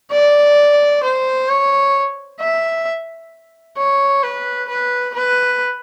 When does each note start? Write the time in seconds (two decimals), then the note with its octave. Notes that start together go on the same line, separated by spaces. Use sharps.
0.12 D5
1.03 C5
1.49 C#5
2.40 E5
3.77 C#5
4.23 B4
4.69 B4
5.14 B4